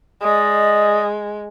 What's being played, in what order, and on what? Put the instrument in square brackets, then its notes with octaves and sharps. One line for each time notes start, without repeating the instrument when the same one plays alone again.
[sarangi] G#3 [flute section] D5 D#5 D#6